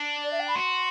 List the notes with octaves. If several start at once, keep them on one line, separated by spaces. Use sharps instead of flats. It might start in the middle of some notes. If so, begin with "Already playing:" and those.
Already playing: D4
D5
E5
G5
B5
F#4 C6